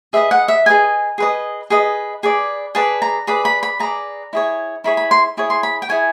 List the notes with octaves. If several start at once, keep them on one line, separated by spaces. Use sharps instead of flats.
G#4 B4 D#5 E5
F#5
E5
G#4 B4 D#5 G#5
G#4 B4 D#5
G#4 B4 D#5
G#4 B4 D5
G#4 B4 D5 A5
A#5
G#4 B4 D5 B5
B5
B5
G#4 B4 D5 A#5
E4 G#4 C#5
E4 G#4 C#5 B5
B5
C6
E4 G#4 C#5
C6
B5
G5
E4 G#4 C#5 G#5